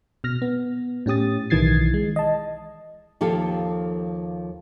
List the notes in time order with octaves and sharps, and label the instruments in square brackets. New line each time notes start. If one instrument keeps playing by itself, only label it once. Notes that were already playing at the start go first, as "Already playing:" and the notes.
[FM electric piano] B2 F6 A#6
B3
A2 C#4 G4 D#6 A6
B1 D#3 E3 G#6 A6 C7
G#3
D#5 A5
[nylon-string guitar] D#2 F3 G4 A4 F5